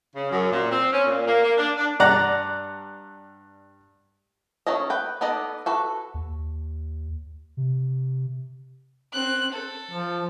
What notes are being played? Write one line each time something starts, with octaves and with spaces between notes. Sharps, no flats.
C#3
F#2
A#2
C4
C#4
A#2
A#3
A#3
D4
D4
G2 D5 F#5 A#5
D#3 C#4 A4 D#5
B4 G5
B3 D#4 A4 D5 D#5
F#4 A4 B4
D#2
C3
C4 F#6
A4
F3